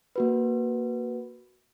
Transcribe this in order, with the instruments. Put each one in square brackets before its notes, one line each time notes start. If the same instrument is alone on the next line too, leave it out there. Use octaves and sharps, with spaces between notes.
[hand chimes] A#3 F#4 B4